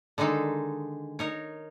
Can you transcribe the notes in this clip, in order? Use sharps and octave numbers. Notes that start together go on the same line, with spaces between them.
D3 D#3 G#3 D#4 A4
D#4 A#4 C#5